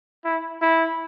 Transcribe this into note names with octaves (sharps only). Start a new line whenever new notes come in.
E4
E4